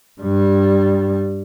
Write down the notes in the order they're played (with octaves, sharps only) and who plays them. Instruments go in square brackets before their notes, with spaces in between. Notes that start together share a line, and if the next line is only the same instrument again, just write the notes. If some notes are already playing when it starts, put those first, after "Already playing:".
[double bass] G2 G3